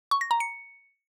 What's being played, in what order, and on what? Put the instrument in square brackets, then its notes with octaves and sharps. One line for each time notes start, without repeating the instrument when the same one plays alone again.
[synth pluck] C#6
A#6
A#5
C#7